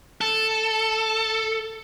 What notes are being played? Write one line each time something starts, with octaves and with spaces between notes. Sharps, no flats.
A4